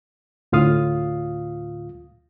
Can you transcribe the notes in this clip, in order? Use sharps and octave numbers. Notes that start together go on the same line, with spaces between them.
D2 A2 F4 F5 D#6